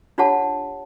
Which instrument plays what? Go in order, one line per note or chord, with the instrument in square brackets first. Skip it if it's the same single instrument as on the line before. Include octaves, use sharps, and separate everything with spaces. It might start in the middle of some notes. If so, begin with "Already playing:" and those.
[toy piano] D4 F4 G4 C#5 F#5 A5